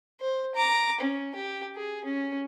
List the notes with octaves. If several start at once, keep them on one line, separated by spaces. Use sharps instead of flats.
C5
A#5 D6
C#4
G4
G#4
C#4